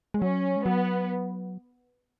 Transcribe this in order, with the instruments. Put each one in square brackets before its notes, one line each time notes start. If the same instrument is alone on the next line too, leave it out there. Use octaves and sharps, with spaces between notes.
[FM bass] G#3
[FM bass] F#3 [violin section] C#4
[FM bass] G#3
[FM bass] F#3 [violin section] B3